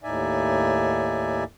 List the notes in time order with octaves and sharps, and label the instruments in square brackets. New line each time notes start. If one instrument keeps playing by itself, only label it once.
[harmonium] D#2 A2 D#4 D5 E5 G#5